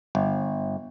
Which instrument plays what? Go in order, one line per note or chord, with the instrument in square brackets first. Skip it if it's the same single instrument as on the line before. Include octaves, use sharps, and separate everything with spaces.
[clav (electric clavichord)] G1